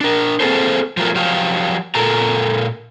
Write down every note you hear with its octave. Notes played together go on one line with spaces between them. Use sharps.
D4 A#4
A#3 C4 G#4 A4 C5
F3 F#3 A3 F4 G4 A#4
F3 F#3 G4 F5
A#2 A4 A#4 A#5